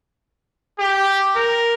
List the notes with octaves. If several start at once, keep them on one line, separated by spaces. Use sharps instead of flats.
G4
A#4